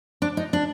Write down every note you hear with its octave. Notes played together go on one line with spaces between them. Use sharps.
D4
D#4
D4